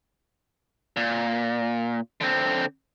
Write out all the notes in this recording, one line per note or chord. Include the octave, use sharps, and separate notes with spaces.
A#2
D3 C4